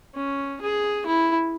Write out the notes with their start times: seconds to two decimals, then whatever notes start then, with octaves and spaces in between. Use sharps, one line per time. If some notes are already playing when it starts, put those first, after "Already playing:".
0.15 C#4
0.61 G#4
1.07 E4